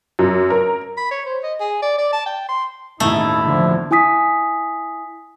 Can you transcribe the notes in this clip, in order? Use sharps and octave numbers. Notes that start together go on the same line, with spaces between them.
F#2
A#4
B5
C#5
C5
D#5
G#4
D5
D5
A5
G5
C6
E1 A1 D#2 A3 D#4 E4
D3 F3
E4 G#5 D#6 B6